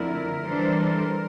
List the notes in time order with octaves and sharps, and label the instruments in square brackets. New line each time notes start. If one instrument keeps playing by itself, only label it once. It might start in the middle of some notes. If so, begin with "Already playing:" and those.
Already playing: [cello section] F2 D3 A3 E4 [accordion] A#4
[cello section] E3 G3 D4 A4 C5